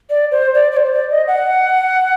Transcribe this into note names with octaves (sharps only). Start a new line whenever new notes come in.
D5
C5
D5
D5
C5
D5
D#5
F#5